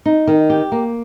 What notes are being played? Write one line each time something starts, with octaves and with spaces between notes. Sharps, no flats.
D#4
D#3
G4
A#3